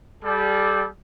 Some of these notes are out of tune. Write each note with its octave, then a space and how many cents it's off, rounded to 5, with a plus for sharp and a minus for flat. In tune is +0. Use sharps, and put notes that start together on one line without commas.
G3 +0 A4 -35